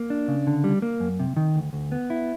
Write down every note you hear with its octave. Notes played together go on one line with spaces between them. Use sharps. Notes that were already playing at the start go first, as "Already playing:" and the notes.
Already playing: A#3
D4
C#3
D3
G3
A#3
F#2
C3
D#3
D2
D2
B3
E4